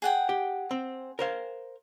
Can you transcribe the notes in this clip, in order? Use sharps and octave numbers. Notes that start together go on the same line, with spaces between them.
G#4 F#5 G5
G4
C4
A#4 C5 F5